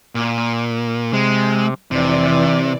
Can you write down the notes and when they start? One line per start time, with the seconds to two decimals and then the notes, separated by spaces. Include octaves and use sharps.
0.15 A#2
1.13 C3 G#3
1.91 F1 C3 E3 D5